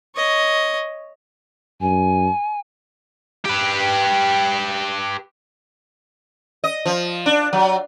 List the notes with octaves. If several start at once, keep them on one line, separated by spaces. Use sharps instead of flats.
C#5 D#5
F#2 G#5
G4 B4
D#5
F3
D4
F#3